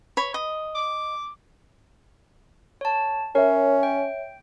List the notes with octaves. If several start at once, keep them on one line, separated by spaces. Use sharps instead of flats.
C#5 B5
D#5
D6
C#5 A5
C#4 A#4 C#5 E5
G5